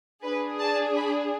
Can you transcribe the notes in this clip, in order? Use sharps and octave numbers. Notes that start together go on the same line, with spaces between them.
D4 G#4 B4
A5
B5